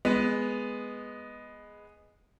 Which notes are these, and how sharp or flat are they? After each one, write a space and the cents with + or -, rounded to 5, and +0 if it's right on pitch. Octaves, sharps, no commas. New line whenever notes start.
G#3 +0 B3 +0